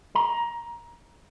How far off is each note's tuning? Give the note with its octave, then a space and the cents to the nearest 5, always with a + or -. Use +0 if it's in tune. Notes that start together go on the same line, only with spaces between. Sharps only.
A#5 +20